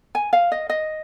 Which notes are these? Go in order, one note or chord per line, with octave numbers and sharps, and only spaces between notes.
G#5
F5
D#5
D#5